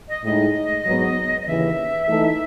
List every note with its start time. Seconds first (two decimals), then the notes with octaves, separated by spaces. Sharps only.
0.09 D#5
0.24 A2 G#3 D#4 G#4 D#5
0.86 G#2 F#3 B3
1.41 D#5
1.47 D#2 C#3 E3 E5
2.08 E3 A3 D#4 A4